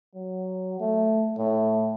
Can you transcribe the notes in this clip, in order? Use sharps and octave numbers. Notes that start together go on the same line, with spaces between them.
F#3
A3
A2